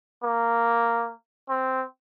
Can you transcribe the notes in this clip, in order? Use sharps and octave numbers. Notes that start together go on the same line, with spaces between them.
A#3
C4